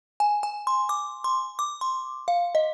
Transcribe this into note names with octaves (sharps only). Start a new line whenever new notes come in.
G#5
G#5
C6
D6
C6
D6
C6
F5
D#5